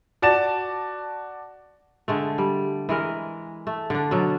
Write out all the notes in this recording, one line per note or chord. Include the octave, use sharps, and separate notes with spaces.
F#4 D5 A5 A6 E7
D3 G#3 A3
G3
E3 G#3 A#4
A3
D3 D4
B2 F#3